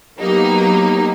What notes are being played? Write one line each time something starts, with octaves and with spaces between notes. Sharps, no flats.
F#3 A#3 B3 D#4 G4